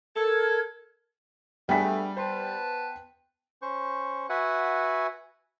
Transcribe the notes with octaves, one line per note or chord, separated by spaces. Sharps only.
A4 A#4 G#6
G3 A3 B3 D4 G#4 G5 B6
B3 B4 C5 A5 C6
C#4 C5 C#6
F#4 B4 E5 F#5 G#5